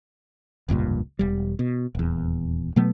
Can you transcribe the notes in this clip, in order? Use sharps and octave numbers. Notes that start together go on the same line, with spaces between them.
F1 C#2 G2 A#2
E1 G3
B2
D#1 E2
B2 F#3 A3 B3